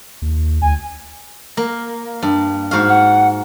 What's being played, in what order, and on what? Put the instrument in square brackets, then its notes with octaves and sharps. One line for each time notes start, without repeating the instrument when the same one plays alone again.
[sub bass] D#2
[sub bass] D2 [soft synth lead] G#5
[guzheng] A#3
G2
G#2 F#4 F5
[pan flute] F#5